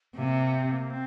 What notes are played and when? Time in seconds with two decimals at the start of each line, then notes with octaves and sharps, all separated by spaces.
0.16 C3 A#3
0.53 C4
0.72 A#3
0.90 C4